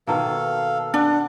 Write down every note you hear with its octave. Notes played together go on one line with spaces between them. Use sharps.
B2 D#3 A#3 A4 F5
D4 F#5